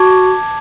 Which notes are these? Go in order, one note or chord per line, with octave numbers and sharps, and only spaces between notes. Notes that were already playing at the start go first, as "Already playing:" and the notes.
Already playing: F#4 A5 D6 G#6